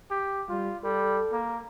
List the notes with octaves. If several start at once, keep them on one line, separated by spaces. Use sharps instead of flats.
G4
G3 F4
G3 A4
A#3